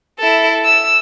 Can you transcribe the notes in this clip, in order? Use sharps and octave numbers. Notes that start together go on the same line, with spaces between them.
E4 A4
E6